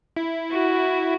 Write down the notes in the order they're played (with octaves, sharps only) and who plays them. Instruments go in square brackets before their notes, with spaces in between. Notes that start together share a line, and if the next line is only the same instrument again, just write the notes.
[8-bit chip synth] E4
[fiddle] F#4